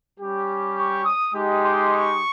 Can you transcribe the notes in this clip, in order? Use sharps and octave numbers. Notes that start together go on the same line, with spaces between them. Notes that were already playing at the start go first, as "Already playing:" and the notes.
G3 C#4 G4
C#6
D#6
G#3 D#4 G4
C6
C#6